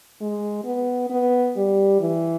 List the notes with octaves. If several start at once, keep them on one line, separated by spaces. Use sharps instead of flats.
G#3
B3
B3
G3
E3